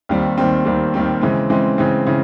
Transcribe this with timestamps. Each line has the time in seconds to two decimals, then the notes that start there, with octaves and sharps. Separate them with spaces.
0.09 D#2 D#3 G3 C4
0.38 D#2 D#3 G3 C4
0.65 D#2 D#3 G3 C4
0.94 D#2 D#3 G3 C4
1.22 C#3 E3 G#3 C4
1.50 C#3 E3 G#3 C4
1.78 C#3 E3 G#3 C4
2.07 C#3 E3